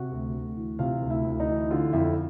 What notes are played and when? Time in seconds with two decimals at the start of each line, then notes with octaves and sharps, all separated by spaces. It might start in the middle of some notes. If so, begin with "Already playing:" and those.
Already playing: C3 F#4 F#5
0.11 D2
0.34 D2
0.56 E3
0.79 C3 F4 F5
1.02 D2
1.10 E4 E5
1.25 D2
1.40 D#4 D#5
1.48 E3
1.70 D3 F4 F5
1.93 F2 E4 E5